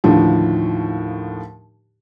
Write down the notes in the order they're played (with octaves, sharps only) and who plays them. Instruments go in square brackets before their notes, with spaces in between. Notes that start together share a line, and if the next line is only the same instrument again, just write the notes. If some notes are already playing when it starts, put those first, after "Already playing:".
[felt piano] D#2 A2 D3 F3